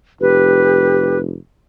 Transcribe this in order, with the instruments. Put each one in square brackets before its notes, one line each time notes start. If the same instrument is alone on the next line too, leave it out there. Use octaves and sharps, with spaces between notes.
[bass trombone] F1 [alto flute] G4 [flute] B4